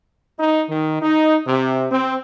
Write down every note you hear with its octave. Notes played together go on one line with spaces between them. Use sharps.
D#4
D#3
D#4
C3
C4